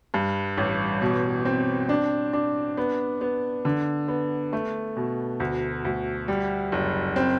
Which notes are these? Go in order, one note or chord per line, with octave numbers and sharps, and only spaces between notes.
G2
A1
B2
C4
D4
D4
B3
B3
D3
B3
A3
B2
D2
D2
G3
F#1
C4